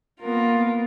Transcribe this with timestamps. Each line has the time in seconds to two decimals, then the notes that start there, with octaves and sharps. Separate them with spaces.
0.21 A#3 B3 F4 A#4